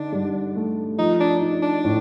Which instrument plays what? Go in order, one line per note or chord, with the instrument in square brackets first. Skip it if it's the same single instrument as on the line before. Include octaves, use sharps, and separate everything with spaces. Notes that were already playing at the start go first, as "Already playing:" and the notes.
Already playing: [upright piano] D3 D#4 [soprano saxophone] D4
[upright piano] G2
A3
[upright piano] F3 [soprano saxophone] D#4
[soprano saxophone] D4
[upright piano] D#4
[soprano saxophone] D4
[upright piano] A2